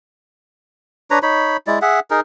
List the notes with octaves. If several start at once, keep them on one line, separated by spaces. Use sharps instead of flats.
D4 B4 C#5 A#5
D#4 C#5 B5
G#3 E4 D5
G#4 E5 F#5
D#4 G#4 A#4